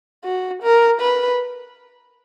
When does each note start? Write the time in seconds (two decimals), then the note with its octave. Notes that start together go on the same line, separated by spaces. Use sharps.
0.24 F#4
0.63 A#4
1.01 B4